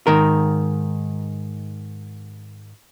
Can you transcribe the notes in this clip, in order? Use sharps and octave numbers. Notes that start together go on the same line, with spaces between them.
G#2 D#3 A#4